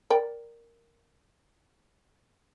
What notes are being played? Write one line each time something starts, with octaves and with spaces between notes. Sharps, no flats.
A#4 D5 G5